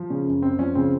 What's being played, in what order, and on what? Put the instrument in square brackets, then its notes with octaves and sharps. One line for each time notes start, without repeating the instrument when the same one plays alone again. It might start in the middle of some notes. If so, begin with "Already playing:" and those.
Already playing: [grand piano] F3
C#3 C#4
F#2
F#2 C4
F3 C#4
C#3 C4